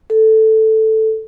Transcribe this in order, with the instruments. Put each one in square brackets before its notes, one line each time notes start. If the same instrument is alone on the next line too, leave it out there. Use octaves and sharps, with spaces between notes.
[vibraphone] A4